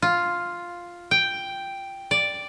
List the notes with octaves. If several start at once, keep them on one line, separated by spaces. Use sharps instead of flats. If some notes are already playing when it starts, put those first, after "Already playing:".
F4
G5
D5